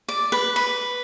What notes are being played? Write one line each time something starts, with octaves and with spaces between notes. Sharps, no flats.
D5
B4
B4